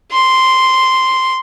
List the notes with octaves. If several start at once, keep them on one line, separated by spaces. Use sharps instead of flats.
C6